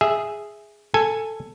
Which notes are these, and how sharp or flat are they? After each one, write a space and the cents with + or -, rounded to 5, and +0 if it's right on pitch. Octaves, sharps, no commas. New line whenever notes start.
G#4 +0 E5 +0
A4 +10 G#5 +0